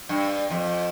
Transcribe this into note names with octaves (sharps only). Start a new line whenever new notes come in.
G2
F2